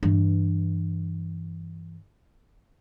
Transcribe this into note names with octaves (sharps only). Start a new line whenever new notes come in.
G2 E3